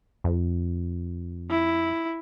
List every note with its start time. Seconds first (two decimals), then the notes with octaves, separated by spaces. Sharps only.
0.24 F2
1.51 E4